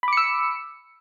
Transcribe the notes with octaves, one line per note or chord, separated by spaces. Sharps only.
B5 D6 E6 C#7